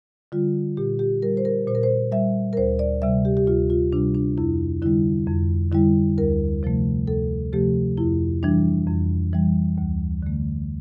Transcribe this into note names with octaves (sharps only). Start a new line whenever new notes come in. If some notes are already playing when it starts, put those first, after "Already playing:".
D3 G3 F4
A#2 G4
G4
G3 A#4
C5
A#4
A#2 C5
A#4
C5
G3 E5
A#4
D2 C5
D5
C3 G3 E5
G4
G4
D2 F4
F4
C3 G3 D4
D4
F2 E4
D3 G3 E4
F2
D3 G3 E4
D2 A#4
C3 F3 A3
D2 A4
C3 F3 A3 G4
F2 E4
E3 G3 D4
F2
E3 G3
D2
D3 A3